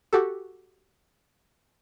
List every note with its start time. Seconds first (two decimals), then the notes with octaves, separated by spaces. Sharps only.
0.13 F#4 G4 A4